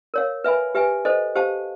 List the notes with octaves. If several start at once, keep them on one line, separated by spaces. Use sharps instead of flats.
A#4 C#5 F5
B4 E5 G#5 B5
G4 B4 E5 G#5
A4 C5 D#5
G4 C5 F5 A5